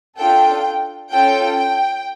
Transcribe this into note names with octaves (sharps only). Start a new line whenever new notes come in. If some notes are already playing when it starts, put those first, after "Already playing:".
D4 F4 A4 G5
C#4 F4 A4 G5
G5